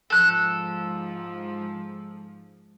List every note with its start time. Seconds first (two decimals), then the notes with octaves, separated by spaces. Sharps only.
0.10 G#2 F3 A4 F#6